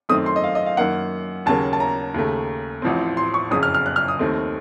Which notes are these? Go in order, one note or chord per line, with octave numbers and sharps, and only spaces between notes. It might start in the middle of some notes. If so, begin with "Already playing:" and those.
F#2 D#3 A3 C4 D#6
C6
D#5
F5
D#5
F5
F#2 D#3 A#3 F#5
D#2 C#3 F#3 A#3 C#4 A5
A5
A#5
D#2 C#3 A3
A1 A2 F3 C4
C6
C#6
F#1 F2 C#3 F#3 D#6
F6
F6
F#6
F6
D#6
D#2 D#3 A3 C4